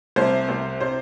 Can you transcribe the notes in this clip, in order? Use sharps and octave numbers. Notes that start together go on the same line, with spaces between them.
C2 C3 C5
C2 C3
C3 C5